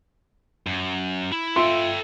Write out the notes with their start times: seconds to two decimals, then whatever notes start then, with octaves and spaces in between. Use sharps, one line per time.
0.67 F#2
1.32 E4
1.56 F4 A4 E5 G5 C6